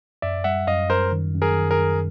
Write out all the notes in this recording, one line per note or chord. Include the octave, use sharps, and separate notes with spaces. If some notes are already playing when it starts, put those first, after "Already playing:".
F#2 D5 E5
G3 E5 F#5
F#2 D#5 F5
F#2 A#4 C5
D#3
F#2
G#4 A#4
D#3
G#4 A#4
F#2